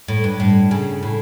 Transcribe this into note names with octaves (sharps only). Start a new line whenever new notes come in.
A2
G2
A2
C#3
A2